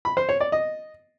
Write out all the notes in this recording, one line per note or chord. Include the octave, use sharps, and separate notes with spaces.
B5
C5
C#5
D5
D#5